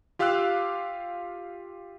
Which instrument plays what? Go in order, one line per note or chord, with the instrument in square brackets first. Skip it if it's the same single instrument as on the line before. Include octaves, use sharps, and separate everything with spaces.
[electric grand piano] F4 G4 F5 D6 E6 F#6